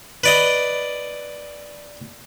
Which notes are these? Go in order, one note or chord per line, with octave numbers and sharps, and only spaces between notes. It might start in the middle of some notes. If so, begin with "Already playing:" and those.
B4 D5 D#5